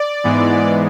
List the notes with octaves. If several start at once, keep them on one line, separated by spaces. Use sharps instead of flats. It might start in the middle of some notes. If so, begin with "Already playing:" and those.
Already playing: D5
G#2 E3 G#3 B3